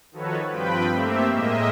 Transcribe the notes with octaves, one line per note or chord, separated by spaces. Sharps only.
D#3 F3 F#4 A4 B4 C#5
G2 F3 C4 B4 G5 B5
A3 A#3 C4 G4 E5
A2 G#3 A#3 D#5 E5